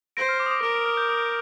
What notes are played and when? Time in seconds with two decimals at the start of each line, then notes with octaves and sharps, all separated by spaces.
0.17 C5 A#6 D7
0.29 F6
0.40 D6
0.46 D#6
0.51 D6
0.63 A#4 D6
0.86 F6
0.97 G6
1.08 D#6